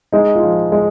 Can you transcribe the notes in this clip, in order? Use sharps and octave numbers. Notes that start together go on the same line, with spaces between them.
G#3 D#4
F4
F3
G#3